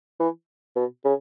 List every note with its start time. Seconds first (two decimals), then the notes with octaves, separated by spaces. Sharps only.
0.20 E3
0.76 B2
1.05 C#3